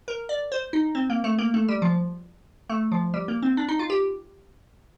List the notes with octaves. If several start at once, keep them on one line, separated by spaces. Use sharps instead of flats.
A#4
D5
C5
D#4
C4
A#3
A3
A#3
A3
G3
F3
A3
F3
G3
A#3
C4
D4
D#4
F4
G4